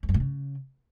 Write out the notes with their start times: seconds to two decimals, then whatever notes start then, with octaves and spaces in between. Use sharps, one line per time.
0.03 F2
0.09 F#2
0.14 A#2
0.20 C#3